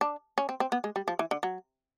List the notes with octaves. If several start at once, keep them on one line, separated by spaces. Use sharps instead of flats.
D4
C#4
C4
C4
B3
G#3
G3
F3
E3
D3
F#3